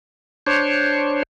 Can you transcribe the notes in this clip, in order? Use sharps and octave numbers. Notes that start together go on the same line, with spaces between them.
D4 C5 C#5